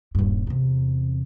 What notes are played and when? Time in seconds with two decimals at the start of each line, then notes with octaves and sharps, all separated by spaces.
0.15 D#1 G2
0.47 E2 C3